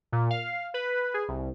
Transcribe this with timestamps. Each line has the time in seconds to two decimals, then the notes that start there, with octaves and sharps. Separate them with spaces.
0.12 A#2
0.30 F5
0.74 B4
1.14 G#4
1.28 C2